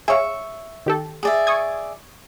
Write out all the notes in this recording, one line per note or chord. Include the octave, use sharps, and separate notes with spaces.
G#4 C#5 E5 F5 C#6
D#3 G4 A4
G#4 D5 E5
C#6 D#6 G#6